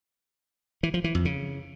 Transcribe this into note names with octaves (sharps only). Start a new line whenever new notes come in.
E3
F3
E3
F2
C#3